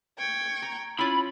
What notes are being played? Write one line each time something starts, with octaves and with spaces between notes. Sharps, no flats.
G5 C#6 G#6
A#5
C#4 E4 F4 B5